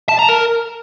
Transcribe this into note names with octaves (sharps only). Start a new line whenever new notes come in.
A5
A#5
A#4